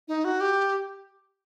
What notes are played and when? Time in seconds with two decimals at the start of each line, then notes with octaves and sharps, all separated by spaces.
0.08 D#4
0.25 F#4
0.40 G4